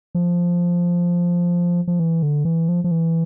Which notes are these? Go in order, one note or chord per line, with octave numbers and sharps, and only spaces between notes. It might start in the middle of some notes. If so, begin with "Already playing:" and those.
F3
F3
E3
D3
E3
F3
F3
E3